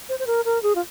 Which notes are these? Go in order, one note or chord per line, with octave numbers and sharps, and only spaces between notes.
C5
C5
A#4
A#4
G#4
F4